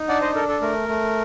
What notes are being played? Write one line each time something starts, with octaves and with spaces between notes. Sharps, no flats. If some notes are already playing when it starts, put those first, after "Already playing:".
Already playing: D#4
D4 D5 F#5
C5 D#5
A4 A#4
A4
A3 A#4
A3